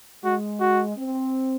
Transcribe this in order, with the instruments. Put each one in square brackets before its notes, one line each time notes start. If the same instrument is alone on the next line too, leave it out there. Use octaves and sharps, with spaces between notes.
[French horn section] G#3 [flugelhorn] F#4
[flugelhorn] F#4
[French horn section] C4